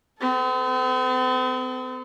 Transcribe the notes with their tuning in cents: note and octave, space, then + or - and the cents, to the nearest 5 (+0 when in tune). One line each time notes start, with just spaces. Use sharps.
C4 -45 A4 -5